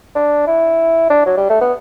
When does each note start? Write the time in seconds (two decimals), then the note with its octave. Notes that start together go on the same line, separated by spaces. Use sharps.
0.15 D4
0.47 E4
1.10 D4
1.26 F#3
1.37 G3
1.50 A3
1.61 B3